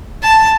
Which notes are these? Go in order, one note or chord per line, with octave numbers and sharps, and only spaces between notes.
A5